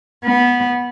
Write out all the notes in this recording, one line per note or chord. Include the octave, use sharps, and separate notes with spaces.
B3